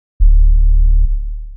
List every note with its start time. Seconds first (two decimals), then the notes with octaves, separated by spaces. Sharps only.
0.20 D1